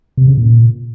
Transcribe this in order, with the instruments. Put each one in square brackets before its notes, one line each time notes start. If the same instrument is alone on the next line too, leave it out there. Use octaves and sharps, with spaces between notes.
[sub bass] C3
C#3
A#2